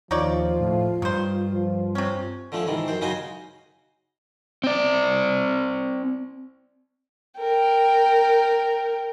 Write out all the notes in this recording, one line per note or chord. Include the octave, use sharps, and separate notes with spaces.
D#2 F3 D#4 F4 C#5 D5
A2
G2 D#3 C5
F3
C3 C4 C#4
D3 F3 A3 C#4
G#2 C3 D#3 E3
F#2 D#3 C5
C#3 C#4 D#4 F#4 G#5 C6
C4 D5
A#4 G5